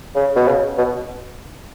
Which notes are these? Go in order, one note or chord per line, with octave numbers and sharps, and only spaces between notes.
C#3
B2
C#3
B2